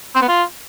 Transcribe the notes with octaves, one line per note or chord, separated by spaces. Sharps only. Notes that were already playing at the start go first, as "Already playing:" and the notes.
C4
B3
F4